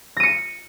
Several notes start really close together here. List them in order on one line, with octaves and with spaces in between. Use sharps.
A#6 D#7 C#7